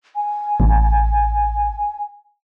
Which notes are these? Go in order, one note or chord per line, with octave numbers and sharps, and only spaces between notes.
G#5
A1